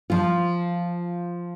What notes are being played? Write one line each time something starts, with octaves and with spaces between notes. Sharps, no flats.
F3 F4